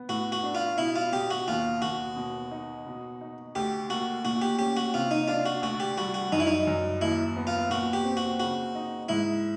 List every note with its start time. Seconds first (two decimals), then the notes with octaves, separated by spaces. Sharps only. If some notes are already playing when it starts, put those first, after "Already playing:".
Already playing: B3
0.09 A2 F#4
0.32 F#4
0.43 D4
0.55 F4
0.78 B2 E4
0.95 F4
1.13 B2 G4
1.30 F#4
1.48 D#2 F4
1.82 D#2 F#4
2.16 B2
2.51 D#4
2.87 B2
3.21 D#4
3.55 D2 G4
3.89 A#3 F#4
4.25 A#2 F#4
4.42 G4
4.59 C#4 G4
4.77 F#4
4.94 C3 F4
5.11 D#4
5.28 D4 F4
5.45 F#4
5.62 D2 F#4
5.80 G4
5.97 G3 F#4
6.14 F#4
6.32 F#2 D#4
6.40 E4
6.47 D#4
6.67 F#2
7.01 D#2 E4
7.37 B3
7.47 F4
7.70 A#2 F#4
7.93 G4
8.05 C4
8.17 F#4
8.40 C#3 F#4
8.75 D#4
9.09 G#2 E4